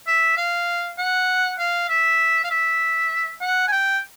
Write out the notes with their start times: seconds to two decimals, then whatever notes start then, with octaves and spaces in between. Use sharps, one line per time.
0.07 E5
0.37 F5
0.98 F#5
1.59 F5
1.89 E5
2.44 F5
2.50 E5
3.41 F#5
3.68 G#5
3.72 G5